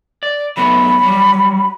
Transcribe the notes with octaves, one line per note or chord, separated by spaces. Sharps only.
D5
F#3 A3 B3 B5
F#3 G3